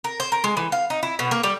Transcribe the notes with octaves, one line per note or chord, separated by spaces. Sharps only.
A#4
C5
A#4
G#3
E3
F5
D#4
E4
B2
A#3
G3